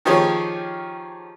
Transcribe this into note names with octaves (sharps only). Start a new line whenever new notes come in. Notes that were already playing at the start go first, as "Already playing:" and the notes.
D#3 F3 C#4 G4 G#4 C#5